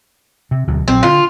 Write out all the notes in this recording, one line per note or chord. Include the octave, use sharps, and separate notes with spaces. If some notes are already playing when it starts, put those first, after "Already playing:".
C3
D2 B2 F#3
A#1 F#3 C4
D3 F4